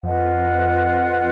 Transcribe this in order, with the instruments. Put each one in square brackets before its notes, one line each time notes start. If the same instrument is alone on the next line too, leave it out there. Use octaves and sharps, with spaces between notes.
[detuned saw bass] F2 [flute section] F4 B4 D#5 F#5